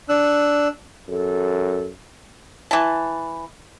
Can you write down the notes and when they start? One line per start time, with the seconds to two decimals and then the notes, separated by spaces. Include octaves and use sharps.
0.09 D4 E6 F#6
1.08 F#2 A4
2.71 E3 A5